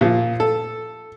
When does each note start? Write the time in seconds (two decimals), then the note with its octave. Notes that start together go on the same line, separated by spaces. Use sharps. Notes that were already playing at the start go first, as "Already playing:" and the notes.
0.01 A#2 F3
0.40 A4